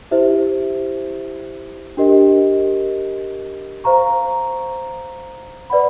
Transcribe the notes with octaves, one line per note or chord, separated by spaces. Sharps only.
E4 G4 C5 E5
D4 G4 A#4 D#5
C5 F5 A#5 C#6
B4 D5 F#5 B5